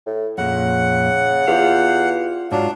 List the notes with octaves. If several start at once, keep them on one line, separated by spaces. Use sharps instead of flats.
A2
F2 A#2 C#3 F#5
E2 F4 G4 F5
G#2 F#3 D4 F4